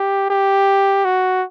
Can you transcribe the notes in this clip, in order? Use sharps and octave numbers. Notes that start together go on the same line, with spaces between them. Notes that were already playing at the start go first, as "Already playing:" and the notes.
Already playing: G4
G4
F#4